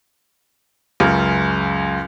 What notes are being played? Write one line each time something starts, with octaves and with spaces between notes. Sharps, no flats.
C#2 F#2 C#3